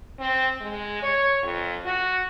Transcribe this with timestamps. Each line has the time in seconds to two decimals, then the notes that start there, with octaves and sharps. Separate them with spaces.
0.19 C4
0.61 G#3
1.02 C#5
1.43 F2
1.85 F#4